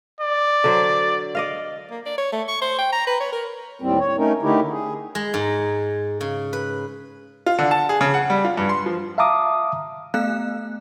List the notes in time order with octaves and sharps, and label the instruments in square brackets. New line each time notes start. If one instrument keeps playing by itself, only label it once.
[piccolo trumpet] D5
[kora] D3 F#3 C5
D5 D#5 F5
[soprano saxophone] A#3
D5
C#5
A3
C#6
C5
G5
A#5
B4
C#5
A#4
[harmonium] D#2 A2 G3 C4
C#5
A3 C#4 D#4 A#4
D3 A3 D#4 E4 G4 A#4
G#4
[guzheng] G#3
G#2
C#3
B4
[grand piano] F4
D3
A5
G#4
C#3
F#5
G3
F4
G2
C6
F3
[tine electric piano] E5 F5 A5 A#5 D6 D#6
[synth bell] A3 B3 F5 F#6